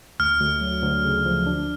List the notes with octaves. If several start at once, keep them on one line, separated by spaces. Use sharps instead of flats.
D2 F6
D2
F#3
D2
C#3
F3
D4